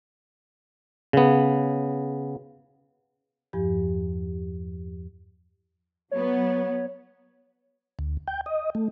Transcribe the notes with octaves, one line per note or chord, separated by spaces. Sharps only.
C#3 B3
E2 G2 F3 G4
F#3 B3 C#5
D2
G5
D#5
A3